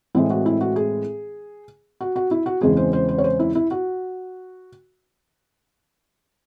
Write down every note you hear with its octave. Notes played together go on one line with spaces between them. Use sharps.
A2 E3 G#3 C4 E4
F#4
E4
F#4
G#4
F#4
F#4
E4
F#4
E2 C#3 G#3 C4 G#4
C5
C5
C5
C#5
C5
E4
E4
F#4